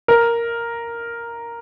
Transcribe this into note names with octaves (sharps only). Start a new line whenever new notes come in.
A#4